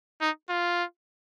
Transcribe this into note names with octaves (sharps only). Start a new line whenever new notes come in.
D#4
F4